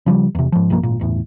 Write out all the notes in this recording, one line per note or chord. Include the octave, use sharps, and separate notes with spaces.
C#3 F3 G3
E2 C3
G#2 F3
B1 G2 F3 A#3
G#1 A#2
G1 E2 A2